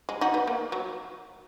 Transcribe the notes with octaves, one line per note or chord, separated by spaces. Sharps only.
G#3
D#4 F#4
B3
A#3
F#3